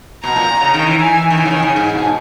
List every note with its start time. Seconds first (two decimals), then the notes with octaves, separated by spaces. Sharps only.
0.23 B2 A#5
0.36 A#2
0.61 C#3
0.74 D#3
0.86 E3
0.99 E3 G#5
1.30 D#3
1.37 E3 G#5
1.45 C#3
1.51 D#3
1.63 C#3
1.75 G#2 G#5
1.95 B2